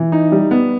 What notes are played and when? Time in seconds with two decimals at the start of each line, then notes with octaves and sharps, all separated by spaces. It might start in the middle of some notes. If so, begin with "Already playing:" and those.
Already playing: E3
0.12 D#4
0.32 G3
0.51 B3